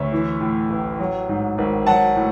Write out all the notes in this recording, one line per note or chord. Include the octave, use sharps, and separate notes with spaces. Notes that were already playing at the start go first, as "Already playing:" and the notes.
Already playing: D2 C#5 E5
E3
A2
A1
F#3
G#2
G#1
F#3 F#5 A5
A2